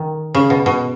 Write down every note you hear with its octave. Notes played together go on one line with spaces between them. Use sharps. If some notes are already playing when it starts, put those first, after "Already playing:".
Already playing: D#3
C#3
B2
B2